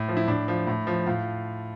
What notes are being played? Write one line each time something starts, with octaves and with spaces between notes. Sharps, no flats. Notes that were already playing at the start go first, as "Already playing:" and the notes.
Already playing: A2
F3
E4
A2 D4
F3
A2
F3
A2 F4